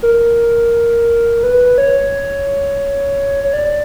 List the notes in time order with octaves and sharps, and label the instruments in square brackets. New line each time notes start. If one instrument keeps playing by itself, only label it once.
[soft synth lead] A#4
B4
C#5
C#5
D5